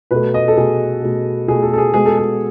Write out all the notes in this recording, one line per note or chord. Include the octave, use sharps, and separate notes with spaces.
B2 A3 B4
D#5
A4
B2 A3 G#4
B2 A3
B2 A3 G#4
A4
A4
G#4
B2 G#3 B3 G#4
A4
G#4